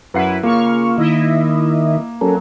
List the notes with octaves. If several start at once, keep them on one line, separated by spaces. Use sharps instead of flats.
F#2 E4 B4 F#5 C7
C#3 A#3 F4 C#6 F6
D#3 E4 D#5 E5
F#3 C#4 A4 A#4